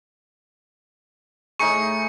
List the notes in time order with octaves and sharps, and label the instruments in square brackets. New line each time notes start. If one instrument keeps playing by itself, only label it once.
[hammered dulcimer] A2 D#4 G#4 [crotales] C#6 C#7